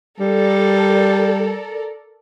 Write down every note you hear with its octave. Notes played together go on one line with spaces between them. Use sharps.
G3 A4 A#4 D5